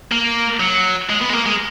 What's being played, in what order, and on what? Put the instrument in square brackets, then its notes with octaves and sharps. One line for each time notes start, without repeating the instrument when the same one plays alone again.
[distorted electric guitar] A#3
F#3
G#3
B3
G#3
A#3
G#3